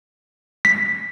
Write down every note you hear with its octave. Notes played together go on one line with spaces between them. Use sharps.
B6